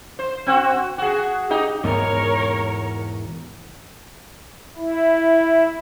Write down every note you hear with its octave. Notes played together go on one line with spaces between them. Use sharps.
C5
C4 F#4
F#4 G#4
D#4 G4 D#5
E2 G#2 B2 A#4 C#5
E4